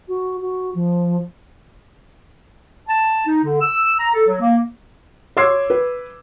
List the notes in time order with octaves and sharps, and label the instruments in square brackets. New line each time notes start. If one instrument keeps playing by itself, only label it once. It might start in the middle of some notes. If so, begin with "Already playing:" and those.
[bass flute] F#4
F#4
F3
[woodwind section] A5
D#4
D3
E6
A#5
A4
F#3
A#3
[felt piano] C#5 C6 D6 E6 G#6 C7
B4